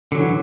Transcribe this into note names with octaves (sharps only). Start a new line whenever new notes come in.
D3 E3 F#3